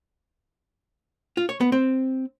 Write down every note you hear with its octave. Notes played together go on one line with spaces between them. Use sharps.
F4
C#5
B3
C4